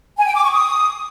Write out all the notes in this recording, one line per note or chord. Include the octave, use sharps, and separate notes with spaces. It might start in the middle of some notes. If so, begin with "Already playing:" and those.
G#5
G5
D6
C#6
D#6